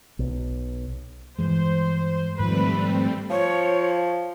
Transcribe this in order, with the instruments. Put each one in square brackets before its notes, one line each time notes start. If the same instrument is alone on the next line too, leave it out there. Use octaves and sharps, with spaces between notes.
[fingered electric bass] B1
[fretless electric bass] G2 E3 G#3 [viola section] C5
[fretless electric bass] G#2 D#3 F3 [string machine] G3 A3 C4 [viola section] B4
[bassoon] F3 [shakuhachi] C#5